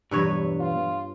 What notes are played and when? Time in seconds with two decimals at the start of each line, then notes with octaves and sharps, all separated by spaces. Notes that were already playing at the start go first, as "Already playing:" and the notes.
0.11 B1 E2 G2 B4 C#5
0.60 F4